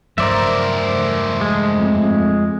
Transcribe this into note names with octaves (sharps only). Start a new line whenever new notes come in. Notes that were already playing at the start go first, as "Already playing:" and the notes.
G2 F3 F#3 A3 A#4 C5 D5 E5
G#3
F2